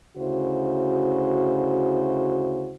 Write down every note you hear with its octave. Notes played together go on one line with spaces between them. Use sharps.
D2 C#3 E4 F#4 C5